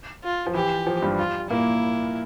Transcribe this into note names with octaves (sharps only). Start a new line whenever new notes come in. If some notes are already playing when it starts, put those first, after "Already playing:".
F4
F3
E3 G4
F3
G2 G3
F4
A#2 A#3 E4